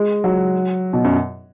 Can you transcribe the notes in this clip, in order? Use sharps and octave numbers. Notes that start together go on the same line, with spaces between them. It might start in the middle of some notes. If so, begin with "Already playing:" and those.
Already playing: G#3
F#3
B2
F#2